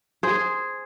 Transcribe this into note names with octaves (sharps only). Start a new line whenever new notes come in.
G#4 C5